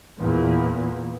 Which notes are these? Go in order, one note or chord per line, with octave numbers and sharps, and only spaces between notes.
E2 A#2